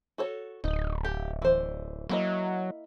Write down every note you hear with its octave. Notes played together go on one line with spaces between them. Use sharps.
F#4 A4 C#5
D1 D#4
G4
E3 C5
F#3 A#3 E4 D#5